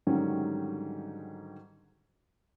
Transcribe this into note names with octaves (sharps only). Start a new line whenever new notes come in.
G#2 D3 D#3 F#3 G3 C#4